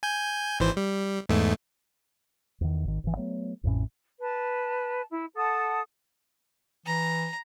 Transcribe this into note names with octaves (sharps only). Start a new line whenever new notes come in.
G#5 G6
G#1 E3 C5
G3
E2 G#2 A3
E2 D#3
G#1 D#3
G#1 E3
F#3 A3 B3
A1 F2 A2 C#4
B4 A5
E4
A4 F#5 A5 D#6
E3 A#5